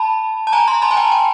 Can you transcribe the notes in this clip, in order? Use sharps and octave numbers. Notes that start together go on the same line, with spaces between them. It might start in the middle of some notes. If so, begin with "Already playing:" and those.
Already playing: A5 B5
A5
G#5 A#5
A#5 C6
A5 B5
G#5
G5 A5
G5 A5